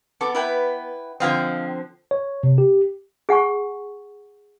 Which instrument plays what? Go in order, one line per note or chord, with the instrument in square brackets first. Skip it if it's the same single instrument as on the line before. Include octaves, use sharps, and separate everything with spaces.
[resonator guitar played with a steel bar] B3 [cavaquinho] A4 D6
[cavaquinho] E4 B4 G5
[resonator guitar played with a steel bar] D3 F3 C4 [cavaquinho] D#5 F5 G5
[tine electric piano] C#5
C3
G4
[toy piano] G#4 F#5 G#5 C#6